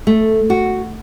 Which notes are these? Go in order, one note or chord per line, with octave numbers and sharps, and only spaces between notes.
A3
F#4